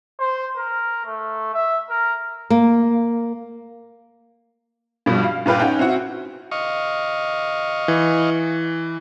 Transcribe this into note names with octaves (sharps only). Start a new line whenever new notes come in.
C5
A#4
A3
E5
A#4
A#3
G2 B2 F3 G3
F5
G2 A#2 B4 F5 G5
C#4 D#4 F#5 G5
C4 E4 F#4
D#5 F5 C#6
E3